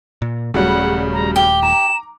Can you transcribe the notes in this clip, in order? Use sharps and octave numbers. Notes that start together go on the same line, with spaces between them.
A#2
D#1 C#3 F#3 G3 A3 F#5
A#5
G4 G7
A#5 E7